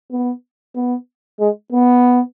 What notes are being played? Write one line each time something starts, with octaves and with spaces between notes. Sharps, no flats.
B3
B3
G#3
B3